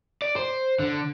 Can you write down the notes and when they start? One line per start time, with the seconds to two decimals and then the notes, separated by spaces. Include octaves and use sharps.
0.22 D5
0.36 C5
0.79 D3